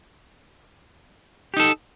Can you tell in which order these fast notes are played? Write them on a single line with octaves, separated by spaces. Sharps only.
G4 D#4 A4